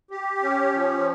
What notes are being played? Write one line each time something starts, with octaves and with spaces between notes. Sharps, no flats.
G4
C#4
F3